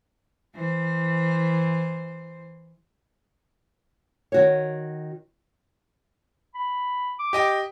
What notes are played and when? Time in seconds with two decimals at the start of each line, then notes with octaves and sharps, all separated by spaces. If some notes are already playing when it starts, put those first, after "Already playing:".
0.55 E3 C5
4.32 D#3 F#4 C#5
6.55 B5
7.19 D6
7.33 G4 D#5 G5